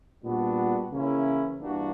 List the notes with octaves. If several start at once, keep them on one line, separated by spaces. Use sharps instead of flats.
A#2 G3 B3 D4 F#4
C#3 E3 A#3 C#4 E4
G2 E3 A#3 D4 F#4